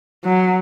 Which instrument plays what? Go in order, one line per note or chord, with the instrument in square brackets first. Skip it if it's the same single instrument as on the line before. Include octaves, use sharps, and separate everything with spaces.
[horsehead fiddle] F#3